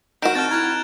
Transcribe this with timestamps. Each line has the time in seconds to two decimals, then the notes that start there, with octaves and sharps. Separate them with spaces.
0.22 D#3 F#4 A#4 G6 D7 E7
0.35 C4 A5 F6 G6 A6
0.51 E4 A#5 F6 F#6 G#6